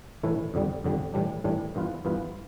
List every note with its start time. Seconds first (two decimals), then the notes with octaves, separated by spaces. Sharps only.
0.23 A2 E3 A3 E4
0.54 F2 D3 G3
0.84 F2 D3 G3
1.14 A2 E3 G3 D4
1.44 A2 E3 G3 D4
1.75 G2 E3 B3 F4 B4
2.05 G2 E3 B3 F4 B4